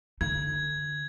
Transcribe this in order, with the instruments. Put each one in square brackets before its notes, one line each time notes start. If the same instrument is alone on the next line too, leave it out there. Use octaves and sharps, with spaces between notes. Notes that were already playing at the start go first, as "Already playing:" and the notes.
[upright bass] D3 D#4 [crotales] G#6